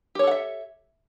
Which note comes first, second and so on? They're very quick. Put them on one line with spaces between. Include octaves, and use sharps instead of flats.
G4 C#5 A4 F#5 E5